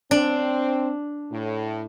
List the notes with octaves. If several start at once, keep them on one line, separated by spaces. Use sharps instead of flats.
C4 D4
A2